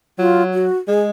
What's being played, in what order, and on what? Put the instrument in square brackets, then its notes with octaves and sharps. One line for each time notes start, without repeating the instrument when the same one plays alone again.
[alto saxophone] F#3 [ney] F4
[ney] F#4
[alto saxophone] G#3 [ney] G#4